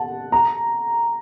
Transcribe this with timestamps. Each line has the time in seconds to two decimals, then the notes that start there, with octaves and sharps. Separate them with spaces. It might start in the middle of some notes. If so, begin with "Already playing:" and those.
Already playing: F#5 A5
0.32 A#5